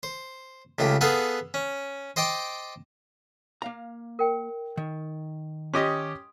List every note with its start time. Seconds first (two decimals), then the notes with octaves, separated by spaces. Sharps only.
0.03 C5
0.79 C#2 C#3 A3 G4
1.01 B3 G#4 A4 F5 F#5
1.54 C#4
2.16 C5 D#5 G5 A5 D6
3.62 A#3 F5 A#5
4.19 A#4 G5
4.77 D#3
5.73 C#4 G4 D#5 C6 D#6